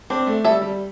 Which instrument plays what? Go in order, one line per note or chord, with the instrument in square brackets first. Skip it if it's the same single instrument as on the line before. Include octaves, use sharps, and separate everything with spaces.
[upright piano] C4 [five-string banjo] D4
[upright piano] A3
[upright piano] G3 [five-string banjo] A4 E5
[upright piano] G3